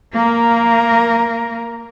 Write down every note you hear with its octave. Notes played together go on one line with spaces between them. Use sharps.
A#3 A#4